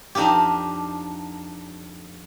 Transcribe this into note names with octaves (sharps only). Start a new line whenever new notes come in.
F2 D4 D#4 F4 G4